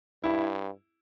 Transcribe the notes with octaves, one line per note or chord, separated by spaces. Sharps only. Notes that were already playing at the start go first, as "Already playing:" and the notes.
G2 E4